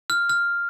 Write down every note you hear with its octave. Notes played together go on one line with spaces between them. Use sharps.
F6
F6